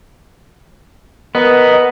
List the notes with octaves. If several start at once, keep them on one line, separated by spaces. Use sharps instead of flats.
B3 A#4 D#5